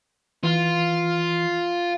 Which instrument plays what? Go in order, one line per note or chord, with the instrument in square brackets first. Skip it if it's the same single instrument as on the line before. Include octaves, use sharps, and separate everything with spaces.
[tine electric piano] E3 [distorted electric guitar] F4